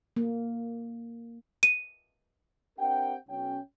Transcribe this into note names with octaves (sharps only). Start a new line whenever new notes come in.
A#3
D#7
C4 D4 G4 A#4 F#5 G5
B1 C#4 G5